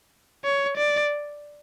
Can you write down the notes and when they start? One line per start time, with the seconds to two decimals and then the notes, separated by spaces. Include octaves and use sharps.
0.44 C#5
0.77 D5